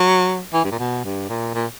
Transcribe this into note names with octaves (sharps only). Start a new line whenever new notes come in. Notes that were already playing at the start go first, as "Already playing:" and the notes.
Already playing: F#3
E3
G2
A#2
B2
G2
A#2
A#2